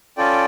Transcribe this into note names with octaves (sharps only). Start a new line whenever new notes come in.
C#4 F4 A4 D5 G5